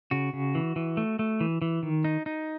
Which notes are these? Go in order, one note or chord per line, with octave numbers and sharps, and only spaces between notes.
C#3 F#4
C#3
E3
E3
A3
A3
E3
E3
D#3
D#4
D#4